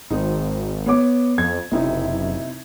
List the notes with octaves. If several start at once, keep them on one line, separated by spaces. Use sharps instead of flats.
G#1 C4 D#4
B3 C#5 D6
F2 G#6
F#1 C3 D#4 E4